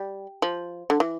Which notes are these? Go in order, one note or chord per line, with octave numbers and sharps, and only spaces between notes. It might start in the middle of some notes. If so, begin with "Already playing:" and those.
Already playing: G3
F3
D3
E3